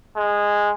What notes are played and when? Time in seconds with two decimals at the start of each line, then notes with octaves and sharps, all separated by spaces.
0.17 G#3